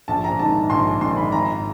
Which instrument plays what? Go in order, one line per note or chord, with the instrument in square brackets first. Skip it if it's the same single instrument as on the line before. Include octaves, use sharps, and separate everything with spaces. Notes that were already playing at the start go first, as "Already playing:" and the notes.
[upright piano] A#1 A5
A#5
G#2 D#3 A5
A#1 C6
G#2 D#3 C6
B5
G#1 A#5